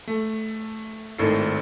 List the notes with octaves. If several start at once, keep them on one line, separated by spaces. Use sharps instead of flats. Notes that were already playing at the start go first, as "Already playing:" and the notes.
A3
G#1 A2 D#3 A3 A4 C7